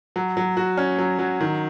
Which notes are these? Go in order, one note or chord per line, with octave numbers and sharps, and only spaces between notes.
F#3
F#3
F#4
C#4
F#3
F#3
D#3